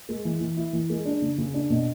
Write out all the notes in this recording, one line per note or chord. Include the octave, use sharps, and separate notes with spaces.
G#3
E3
E3
E4
E3
G#3
D4
C#3
C#3
D4
B2